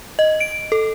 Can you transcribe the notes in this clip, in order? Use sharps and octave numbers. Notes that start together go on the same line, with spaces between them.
D#5
D7
A4